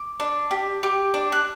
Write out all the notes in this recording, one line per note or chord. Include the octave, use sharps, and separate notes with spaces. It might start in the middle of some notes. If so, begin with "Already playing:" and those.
Already playing: D6
D4
G4
G4
D4
F#6